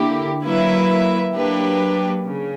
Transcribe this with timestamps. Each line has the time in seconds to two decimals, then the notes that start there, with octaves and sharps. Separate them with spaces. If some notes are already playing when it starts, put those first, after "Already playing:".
Already playing: D3 A#3 E4 G4
0.45 F#3 A#3 E4 B4 E5
1.35 F#3 A#3 D4 G4 B4
2.26 C#3